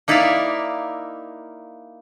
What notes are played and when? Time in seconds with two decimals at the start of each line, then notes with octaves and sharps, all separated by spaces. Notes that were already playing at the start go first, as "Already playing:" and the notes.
0.08 A#3 D#4 E4 D5 E5 F5